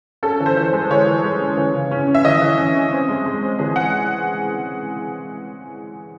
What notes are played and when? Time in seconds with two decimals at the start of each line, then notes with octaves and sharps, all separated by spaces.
0.23 C#4 A4
0.40 E3
0.46 C5
0.57 E3
0.68 G#3 C5
0.91 E3 C#5
1.06 E3
1.24 G#3
1.41 C#4
1.57 E3
1.74 C#3
1.91 C#4
2.08 C#4
2.15 E5
2.24 E3 D#5
2.42 E3
2.59 C#4
2.75 C#4
2.92 C4
3.09 G#3
3.26 G#3
3.43 C4
3.59 E3 G#4
3.76 G#3 F#5